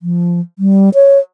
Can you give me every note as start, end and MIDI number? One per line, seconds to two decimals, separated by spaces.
0.01 0.40 53
0.59 0.90 55
0.94 1.18 73